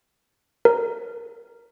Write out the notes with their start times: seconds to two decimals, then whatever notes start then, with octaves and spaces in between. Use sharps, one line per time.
0.65 A#4